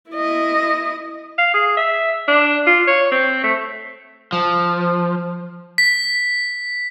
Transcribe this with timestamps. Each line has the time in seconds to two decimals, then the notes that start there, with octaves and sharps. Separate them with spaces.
0.11 E4 D#5
1.38 F5
1.54 G#4
1.77 E5
2.28 D4
2.67 F4
2.87 C#5
3.11 C4
3.44 A3
4.33 F3
5.78 B6